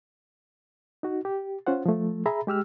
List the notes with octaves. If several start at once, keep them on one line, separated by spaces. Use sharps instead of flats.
D#4 F#4
G4
C#4 F4 C5 F#5
F3 A3
G#4 E5 A#5 B5
G#3 G4 E6 F6